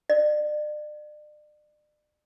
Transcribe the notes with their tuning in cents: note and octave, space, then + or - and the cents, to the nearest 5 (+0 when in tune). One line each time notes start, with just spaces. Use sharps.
D5 +40